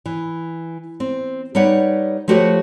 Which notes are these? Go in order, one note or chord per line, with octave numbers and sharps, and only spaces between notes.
E3
C4
G3 D#4 B4 C#5 D5 F#5
F3 A3 F#4 G4 B4 C#5